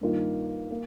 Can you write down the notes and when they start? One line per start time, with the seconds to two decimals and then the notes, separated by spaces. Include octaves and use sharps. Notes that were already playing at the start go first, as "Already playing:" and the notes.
0.01 G2 D#3 A#3 F4
0.71 A#3